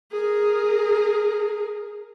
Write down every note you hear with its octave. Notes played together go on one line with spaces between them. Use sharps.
G#4 A#4